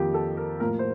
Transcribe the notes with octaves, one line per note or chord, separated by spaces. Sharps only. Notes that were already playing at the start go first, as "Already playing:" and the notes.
Already playing: F2 D#3 A#3 F4 G4
A4
A#4
A2 F3 A#3 A#4
C5